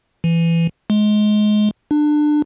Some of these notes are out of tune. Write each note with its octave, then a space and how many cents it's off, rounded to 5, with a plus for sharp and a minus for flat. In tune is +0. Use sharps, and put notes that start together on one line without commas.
E3 +20
G#3 +25
D4 +25